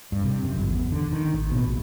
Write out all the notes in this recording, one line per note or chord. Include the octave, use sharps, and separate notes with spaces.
G2
C3
F#2
G1
E2
D3
D#3
A1
B2
A#1